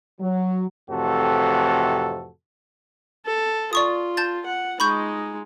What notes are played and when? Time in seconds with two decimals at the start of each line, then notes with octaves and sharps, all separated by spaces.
0.21 F#3
0.90 F2 A2 C3 E3 F#4 A4
3.26 A4
3.73 F4 D5 C#6 D#6
4.17 A5 G6 A6
4.46 F#5
4.80 G#3 D#4 B5 C#6 G6